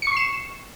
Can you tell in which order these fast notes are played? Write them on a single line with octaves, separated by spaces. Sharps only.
C#7 C#6 C7 E7